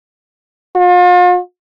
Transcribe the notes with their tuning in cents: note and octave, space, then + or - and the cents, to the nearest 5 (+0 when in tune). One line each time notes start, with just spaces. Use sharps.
F4 +40